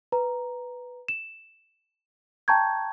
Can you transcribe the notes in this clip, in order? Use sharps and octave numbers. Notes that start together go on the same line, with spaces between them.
B4 A#5
E7
G5 A5 A#5 C#6 G6 G#6